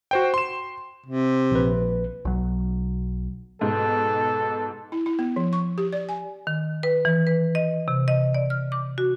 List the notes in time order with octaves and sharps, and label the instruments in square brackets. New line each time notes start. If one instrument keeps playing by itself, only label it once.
[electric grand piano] F#4 C5 G5
C6 E7
[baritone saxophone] C3
[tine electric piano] A#1 B4
[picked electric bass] B1 F#3
[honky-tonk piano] G#2 B2 [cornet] A4
[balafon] E4
E4
B3
F3
C#6
G4
D5
G#5
[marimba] D#3
B4
E3
B4
D#5
C3
D#5
D5
F6
D6
F#4